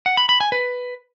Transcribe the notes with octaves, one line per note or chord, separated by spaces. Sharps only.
F#5
B5
B5
G#5
B4